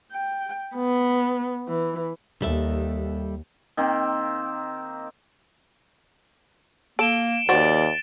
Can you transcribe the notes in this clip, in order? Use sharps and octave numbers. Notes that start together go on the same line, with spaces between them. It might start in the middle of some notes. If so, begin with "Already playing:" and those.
G5
B3
E3
D#2 G3 A4 E5
D#3 A#3 C4
A#3 A4 D7 E7 G7
D#2 F#4 C5 D5 A6